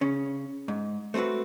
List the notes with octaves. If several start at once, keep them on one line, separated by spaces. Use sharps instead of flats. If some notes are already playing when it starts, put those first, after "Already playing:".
C#3 C#4
G#2
A3 C4 F4 F#4 B4